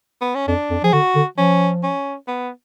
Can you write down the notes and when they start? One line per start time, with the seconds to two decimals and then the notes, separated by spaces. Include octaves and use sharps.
0.21 B3
0.35 C#4
0.48 F2 D4
0.70 F2
0.84 F3 G#4
0.93 D3 F#4
1.15 D3
1.38 F3 C#4
1.83 C#4
2.28 B3